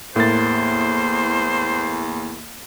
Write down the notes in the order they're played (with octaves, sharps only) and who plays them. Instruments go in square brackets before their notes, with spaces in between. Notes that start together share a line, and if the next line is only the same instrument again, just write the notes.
[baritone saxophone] E2 [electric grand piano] A2 A#4 A6 [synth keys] A#3 [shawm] C5